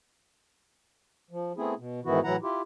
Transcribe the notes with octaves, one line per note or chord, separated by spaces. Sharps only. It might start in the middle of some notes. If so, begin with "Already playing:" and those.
F3
A3 B3 C4 E4 G#4
B2
G#2 D#3 E3 B3 E4 F#4
A2 E3 F#3 E4 F#5 A#5
E4 F4 G4